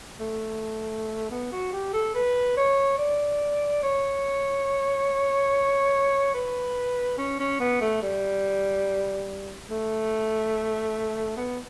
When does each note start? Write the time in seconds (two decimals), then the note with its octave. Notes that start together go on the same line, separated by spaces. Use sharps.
0.20 A3
1.31 B3
1.52 F#4
1.72 G4
1.93 A4
2.15 B4
2.57 C#5
2.98 D5
3.83 C#5
6.34 B4
7.18 C#4
7.40 C#4
7.60 B3
7.81 A3
8.02 G3
9.70 A3
11.37 B3